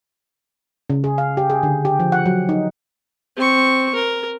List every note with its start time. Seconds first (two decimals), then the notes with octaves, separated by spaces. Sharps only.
0.90 C#3
1.04 G#4
1.18 F5
1.37 G4
1.50 G#4
1.63 D3
1.85 G4
2.00 F3
2.12 F#5
2.26 F#3
2.49 D#4
3.36 C4 C#6
3.95 A#4